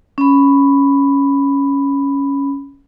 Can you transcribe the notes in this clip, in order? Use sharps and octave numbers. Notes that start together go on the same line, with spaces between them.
C#4 B5